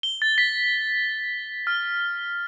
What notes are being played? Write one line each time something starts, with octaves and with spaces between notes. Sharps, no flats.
G7
A6
B6
F6